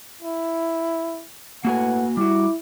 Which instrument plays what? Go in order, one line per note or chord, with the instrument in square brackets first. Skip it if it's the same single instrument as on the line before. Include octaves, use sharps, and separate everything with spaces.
[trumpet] E4
[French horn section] A2 A3 B4 [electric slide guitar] A#3 F#4 G#5 [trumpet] F#5
[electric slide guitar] G3 F#4 [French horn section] E4 [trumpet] D6